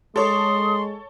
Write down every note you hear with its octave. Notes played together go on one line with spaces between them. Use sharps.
G#3 A4 C#5 C6 D#6